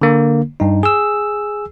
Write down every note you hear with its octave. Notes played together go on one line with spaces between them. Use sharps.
D3 A#3
G2 D#4
G#4 E6